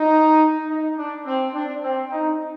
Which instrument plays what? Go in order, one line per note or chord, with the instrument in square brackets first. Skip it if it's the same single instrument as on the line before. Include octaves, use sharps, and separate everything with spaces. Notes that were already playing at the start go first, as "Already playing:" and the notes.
Already playing: [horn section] D#4
D#4
D4
C4
D4
C4
D#4